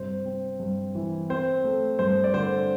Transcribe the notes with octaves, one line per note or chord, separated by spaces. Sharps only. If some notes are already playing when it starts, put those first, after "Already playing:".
Already playing: G2 C3 C5
C4
G2
E3
C4 C5
A3
G2 C5
D5
D3 C5